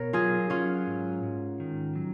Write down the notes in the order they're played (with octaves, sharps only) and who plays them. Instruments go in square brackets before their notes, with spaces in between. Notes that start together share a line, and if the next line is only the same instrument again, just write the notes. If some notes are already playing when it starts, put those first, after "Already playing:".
Already playing: [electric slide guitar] B2 [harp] A#4 C#5
[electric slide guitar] F#3 [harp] F4 G#4
[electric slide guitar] F#3 [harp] C#4 F4
[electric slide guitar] G#2
G#2
D#3
F#3